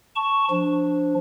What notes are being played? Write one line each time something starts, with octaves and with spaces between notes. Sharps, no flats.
A5 C#6
F3 D4